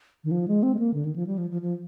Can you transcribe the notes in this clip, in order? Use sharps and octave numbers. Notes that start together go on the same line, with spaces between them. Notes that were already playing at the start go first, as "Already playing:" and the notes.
D#3
F3
G#3
C4
G#3
A#3
D3
D#3
F3
G3
F3
F3
F3